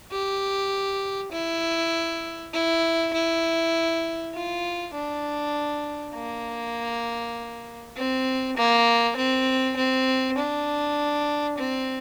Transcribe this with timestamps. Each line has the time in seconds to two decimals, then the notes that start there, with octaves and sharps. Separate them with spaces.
0.11 G4
1.32 E4
2.53 E4
3.13 E4
4.34 F4
4.94 D4
6.14 A#3
7.96 C4
8.57 A#3
9.16 C4
9.76 C4
10.38 D4
11.58 C4